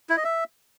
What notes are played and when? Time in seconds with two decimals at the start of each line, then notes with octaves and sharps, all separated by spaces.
0.09 E4
0.17 D#5
0.24 E5